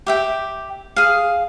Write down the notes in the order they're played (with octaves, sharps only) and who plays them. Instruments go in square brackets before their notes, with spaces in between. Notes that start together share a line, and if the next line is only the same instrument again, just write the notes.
[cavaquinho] G4 E5 G5
G#4 F5